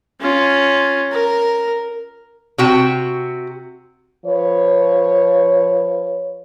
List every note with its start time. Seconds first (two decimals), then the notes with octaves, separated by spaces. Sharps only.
0.21 C#4 F4
1.12 A#4
2.58 C3 F#4 G5
4.26 F3 B4 C#5